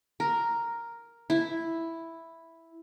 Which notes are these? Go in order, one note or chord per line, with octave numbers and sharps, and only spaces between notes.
A#4
E4